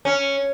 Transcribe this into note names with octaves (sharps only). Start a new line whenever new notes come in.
C#4